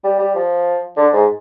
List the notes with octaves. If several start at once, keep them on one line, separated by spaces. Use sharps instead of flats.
G3
G3
F3
D3
G#2